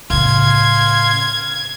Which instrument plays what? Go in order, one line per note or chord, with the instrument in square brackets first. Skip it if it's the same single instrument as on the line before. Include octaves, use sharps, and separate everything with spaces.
[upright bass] A2 C#3 [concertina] F5 C6 [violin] G#6